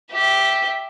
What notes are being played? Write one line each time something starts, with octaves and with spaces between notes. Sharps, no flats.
G4 E5